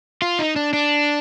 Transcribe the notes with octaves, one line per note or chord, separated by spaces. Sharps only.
F4
D#4
D4
D4